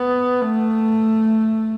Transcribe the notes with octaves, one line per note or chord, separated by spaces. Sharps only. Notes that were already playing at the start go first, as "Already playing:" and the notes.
Already playing: B3
A3